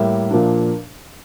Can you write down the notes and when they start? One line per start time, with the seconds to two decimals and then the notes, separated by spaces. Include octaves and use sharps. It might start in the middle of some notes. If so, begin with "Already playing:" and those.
Already playing: A2 G3 A#3 E5
0.30 A#2 F3 A#3 D4